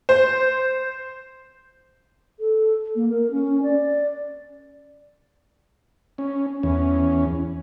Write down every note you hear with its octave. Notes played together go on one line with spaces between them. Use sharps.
C5
A4
A#3
A#4
C#4
D5
C#4
E2 C#4